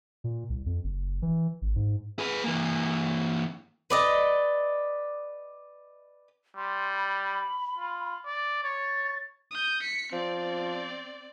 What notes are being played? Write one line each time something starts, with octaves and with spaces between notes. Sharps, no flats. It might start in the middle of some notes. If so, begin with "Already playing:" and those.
A#2
C2
F2
F#1
E3
G#1
G#2
G#4 B4
E3 A#3
B4 D5 D#5
G3 C6
B5
F4
D5
C#5 A6
D#6 G6
B6 C#7
F3 C4 D5